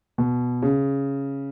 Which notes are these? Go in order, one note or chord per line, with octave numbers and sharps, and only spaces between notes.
B2
C#3